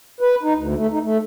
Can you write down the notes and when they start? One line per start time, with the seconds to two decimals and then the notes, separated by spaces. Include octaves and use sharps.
0.21 B4
0.43 D#4
0.56 D2
0.76 A3
0.92 D#4
1.03 A3